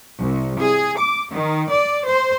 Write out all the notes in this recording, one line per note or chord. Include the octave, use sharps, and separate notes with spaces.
C2
G#4
D6
D#3
D5
C5